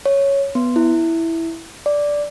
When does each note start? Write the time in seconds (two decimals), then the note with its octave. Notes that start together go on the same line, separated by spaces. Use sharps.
0.06 C#5
0.55 B3
0.76 E4
1.86 D5